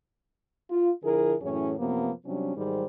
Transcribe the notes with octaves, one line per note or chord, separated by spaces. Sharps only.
F4
D3 F3 E4 G#4 A#4
F#2 A2 E3 C#4 G#4 C#5
F#2 C3 F3 A#3 B3
C3 F#3 G3 C#4 D4
G#2 D#3 F#3 G3 G#4 C5